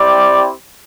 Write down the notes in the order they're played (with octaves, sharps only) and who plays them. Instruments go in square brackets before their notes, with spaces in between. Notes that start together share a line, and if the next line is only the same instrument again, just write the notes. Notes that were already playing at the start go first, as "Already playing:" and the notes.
Already playing: [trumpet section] C4 E4 G4 D5